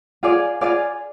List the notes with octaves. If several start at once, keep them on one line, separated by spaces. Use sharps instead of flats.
F4 G#4 D5 F5
F4 G#4 D5 F5